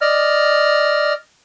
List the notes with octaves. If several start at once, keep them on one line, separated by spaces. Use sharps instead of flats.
D5 D#5 F6